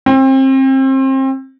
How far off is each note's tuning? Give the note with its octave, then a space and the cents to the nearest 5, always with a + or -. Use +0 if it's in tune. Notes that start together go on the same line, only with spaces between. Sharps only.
C4 +30